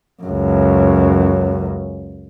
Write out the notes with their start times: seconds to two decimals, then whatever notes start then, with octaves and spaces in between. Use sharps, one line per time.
0.23 C#2 F#2